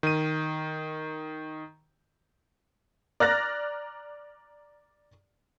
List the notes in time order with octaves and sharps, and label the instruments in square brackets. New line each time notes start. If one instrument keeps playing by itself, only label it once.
[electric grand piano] D#3 D#7
[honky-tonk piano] D5 A#5 F6 F#6 A6 A#6